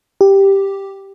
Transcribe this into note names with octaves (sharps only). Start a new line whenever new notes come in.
G4